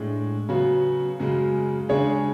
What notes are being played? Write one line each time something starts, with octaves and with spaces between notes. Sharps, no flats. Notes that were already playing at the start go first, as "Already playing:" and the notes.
Already playing: A2 G#3 D4
C#3 F#3 B3 F#4
F#2 C#3 G#3
C#3 G#3 D4 G#4 C#5